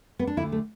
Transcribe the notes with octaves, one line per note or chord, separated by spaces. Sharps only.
B3
D4
D2 D3 E4
A3